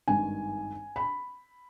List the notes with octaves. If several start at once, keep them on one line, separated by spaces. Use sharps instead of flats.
G#1 G2 D#3 G#5
B5